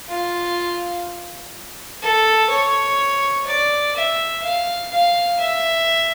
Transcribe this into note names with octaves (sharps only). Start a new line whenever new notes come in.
F4
A4
C#5
D5
E5
F5
F5
E5